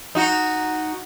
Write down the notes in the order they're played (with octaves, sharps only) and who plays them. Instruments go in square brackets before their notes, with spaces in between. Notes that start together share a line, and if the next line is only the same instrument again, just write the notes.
[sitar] D#4 F#4